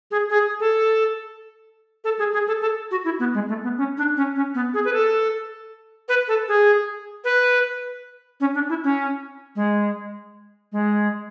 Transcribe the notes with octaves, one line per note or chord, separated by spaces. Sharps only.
G#4
G#4
A4
A4
G#4
G#4
A4
A4
F#4
E4
B3
G#3
A3
B3
C#4
D4
C#4
C#4
B3
G#4
B4
A4
B4
A4
G#4
B4
C#4
D4
E4
C#4
G#3
G#3